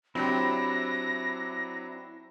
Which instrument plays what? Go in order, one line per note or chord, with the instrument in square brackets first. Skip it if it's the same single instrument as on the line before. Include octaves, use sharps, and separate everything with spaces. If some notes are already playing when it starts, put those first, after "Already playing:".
[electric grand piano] F#3 D4 G4 [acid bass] C4 [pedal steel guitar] E4 [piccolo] A#6